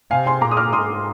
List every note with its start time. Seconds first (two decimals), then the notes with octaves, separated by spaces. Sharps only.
0.11 C3 F5 G#5
0.26 G#5 C6
0.41 A#2 A#5 D6
0.51 D#6
0.57 D6 F6
0.72 G#2 C6 D#6